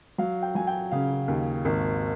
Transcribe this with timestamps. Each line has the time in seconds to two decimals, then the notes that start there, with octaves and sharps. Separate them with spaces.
0.18 F#3 F5
0.42 G5
0.55 F#3 G#5
0.67 G5
0.91 C#3 F5
1.28 D#2
1.65 G#1